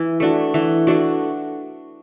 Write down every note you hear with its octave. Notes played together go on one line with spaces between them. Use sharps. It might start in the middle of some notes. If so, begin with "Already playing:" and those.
Already playing: E3
A3 D4 F#4
E3
A3 D4 F#4